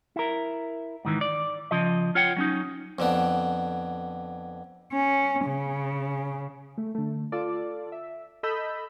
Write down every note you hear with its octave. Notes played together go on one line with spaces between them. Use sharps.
E4 A#4
G#2 D#3 E3
D5
C#3 F3 D#5
F4 C#5 F#5 G5
F#3 C#4 D#4
F2 D3 B3
C#4
C#3
A3
D3 A3
F4 A4 D5
E5
A4 D#5 B5 D#6 E6 G6